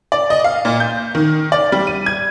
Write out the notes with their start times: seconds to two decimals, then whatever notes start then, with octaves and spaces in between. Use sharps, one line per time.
0.12 D5
0.30 D#5
0.44 F5
0.65 A#2
0.80 G6
1.15 D#3
1.52 D5
1.72 G3
1.87 D#7
2.06 G#6